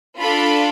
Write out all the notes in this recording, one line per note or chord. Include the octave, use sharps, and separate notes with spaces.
D4 F4 A4 B5